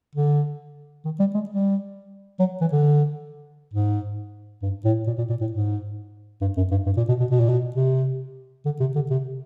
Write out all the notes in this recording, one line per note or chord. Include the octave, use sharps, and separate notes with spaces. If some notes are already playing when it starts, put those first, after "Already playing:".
D3
D#3
G3
G#3
G3
F#3
E3
D3
G#2
G2
A2
A#2
A#2
A#2
A2
G#2
G2
F#2
G2
G2
A#2
B2
B2
B2
A#2
B2
C3
D3
C3
D3
C3